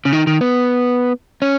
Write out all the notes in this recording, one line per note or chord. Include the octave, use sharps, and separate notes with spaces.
C#3
D#3
D#3
B3
C#4